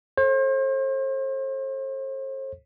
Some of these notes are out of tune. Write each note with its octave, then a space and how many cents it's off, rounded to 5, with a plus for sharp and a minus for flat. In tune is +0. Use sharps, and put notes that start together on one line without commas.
A4 -15 C5 +40